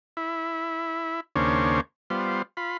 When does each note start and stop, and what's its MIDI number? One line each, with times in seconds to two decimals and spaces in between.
0.17 1.20 64
1.36 1.81 39
1.36 1.81 49
1.36 1.81 58
1.36 1.81 62
1.36 1.81 72
1.36 1.81 73
2.10 2.42 55
2.10 2.42 59
2.10 2.42 65
2.10 2.42 72
2.57 2.77 65
2.57 2.77 83